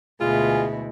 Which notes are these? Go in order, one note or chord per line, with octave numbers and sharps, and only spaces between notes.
D2 B2 G#3 E4 F4 G#4